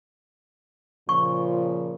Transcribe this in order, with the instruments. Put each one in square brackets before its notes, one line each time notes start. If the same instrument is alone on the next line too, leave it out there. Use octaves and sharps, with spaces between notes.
[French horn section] A#2 C#3 F3 [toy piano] C#6